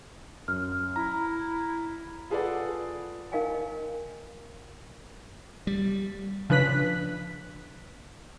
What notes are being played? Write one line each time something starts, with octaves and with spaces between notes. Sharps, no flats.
F#2 F6
E4 A#5
F4 G#4 A4 B4 D5 F#5
D#4 A#4 D#5 F5 G5 G#5
G3
C#3 F3 D4 B4 F#6 B6